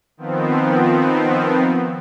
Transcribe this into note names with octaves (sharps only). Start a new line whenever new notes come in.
D#3 F3 B3 C4